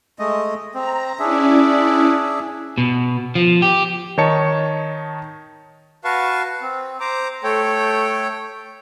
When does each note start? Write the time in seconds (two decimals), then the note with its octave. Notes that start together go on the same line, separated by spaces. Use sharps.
0.19 G#3 A3 D#5
0.74 C4 A#5
1.19 C#4 D4 E4 G#4 D5 E5
2.78 B2
3.35 F3
3.62 G4
4.18 D#3 D#4 C#5 A5 C#7
6.04 F#4 B4 F5 A5 C#6
6.62 C4
7.00 C5 A#5 D6
7.43 A3 A4 C#5 G5